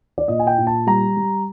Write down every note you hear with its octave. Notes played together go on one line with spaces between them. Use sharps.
D5
A#2 D#5
G#5
G5
A#2
A5
G3 A#5
G3